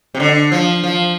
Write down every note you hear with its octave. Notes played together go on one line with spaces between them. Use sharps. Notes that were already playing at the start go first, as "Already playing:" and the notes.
C3
D3
F3
F3